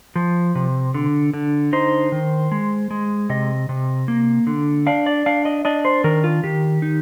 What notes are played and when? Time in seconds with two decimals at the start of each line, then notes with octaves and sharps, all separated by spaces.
0.16 F3
0.55 C3
0.94 D3
1.34 D3
1.73 D#4 C5
2.12 D#3
2.52 G#3
2.91 G#3
3.29 C3 D#5
3.69 C3
4.08 A#3
4.47 D3
4.87 D4 F5
5.06 D5
5.26 D4 F5
5.45 D#5
5.65 D4 D#5
5.85 C5
6.04 D#3 A#4
6.24 F4
6.44 D#3 G4
6.82 D#4